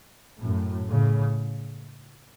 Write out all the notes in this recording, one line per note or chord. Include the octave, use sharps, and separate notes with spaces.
F#2 A2
A2 C#3